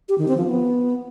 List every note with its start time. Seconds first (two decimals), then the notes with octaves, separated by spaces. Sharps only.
0.09 G4
0.18 D#3
0.28 C4
0.38 F3
0.47 B3